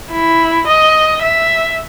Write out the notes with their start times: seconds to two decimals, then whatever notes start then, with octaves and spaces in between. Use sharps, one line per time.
0.11 E4
0.67 D#5
1.22 E5